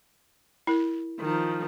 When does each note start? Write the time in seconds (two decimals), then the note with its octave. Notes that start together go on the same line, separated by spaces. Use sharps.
0.67 E4 A#4
1.20 D#3 F3